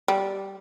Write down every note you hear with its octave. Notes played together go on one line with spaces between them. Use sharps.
G3